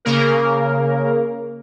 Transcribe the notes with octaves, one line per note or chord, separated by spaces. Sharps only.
C#3 A#3 A#4